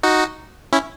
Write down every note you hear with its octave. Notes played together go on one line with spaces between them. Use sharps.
D#4 F#4
C#4 E4